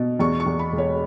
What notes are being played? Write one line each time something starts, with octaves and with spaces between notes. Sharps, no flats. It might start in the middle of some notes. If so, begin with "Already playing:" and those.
Already playing: B2
E2 C#6
C#6
E2
B5
E1
C#5